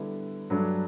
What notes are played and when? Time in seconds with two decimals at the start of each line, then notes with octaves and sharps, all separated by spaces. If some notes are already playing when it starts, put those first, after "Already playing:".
Already playing: D3 G3 B3 E4
0.50 G2 F#3 A3 D4